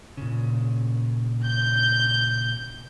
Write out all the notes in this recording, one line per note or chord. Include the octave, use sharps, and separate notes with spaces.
A#2 C#3
G6